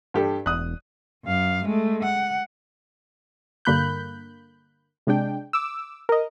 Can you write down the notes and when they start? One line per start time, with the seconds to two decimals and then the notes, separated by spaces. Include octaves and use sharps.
0.14 G2 G4 A4
0.46 E1 D#6 F#6
1.25 F#2 F5
1.65 G#3 A3
2.04 F#5
3.65 G2 D3 A#3 B5 F#6 G6
5.07 C3 G#3 D4 G5
5.53 D6 E6
6.09 A#4 D#5